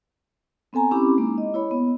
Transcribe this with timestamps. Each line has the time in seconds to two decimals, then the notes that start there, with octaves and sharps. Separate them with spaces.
0.73 B3 C4 A4 G#5 A#5
0.91 C4 C#4 E4 G4 B5 D6
1.18 G#3 A#3 D#4
1.38 D#5
1.54 E4 C#5 B5
1.71 B3